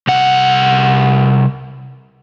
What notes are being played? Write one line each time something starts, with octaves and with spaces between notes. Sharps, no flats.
C2 F#5